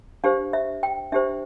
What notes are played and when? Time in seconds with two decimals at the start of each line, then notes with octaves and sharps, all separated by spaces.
0.24 D4 G4 C5 F5
0.53 E5
0.83 G5
1.12 D4 G4 C5 E5